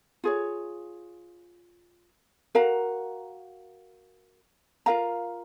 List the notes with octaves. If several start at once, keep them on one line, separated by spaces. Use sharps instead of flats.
F4 G#4 C#5
F#4 A#4 F5 A#5
F4 A#4 F5 A#5